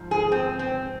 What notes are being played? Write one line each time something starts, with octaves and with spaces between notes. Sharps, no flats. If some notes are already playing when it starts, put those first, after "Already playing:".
Already playing: G#2 F3
G#4
C4
C4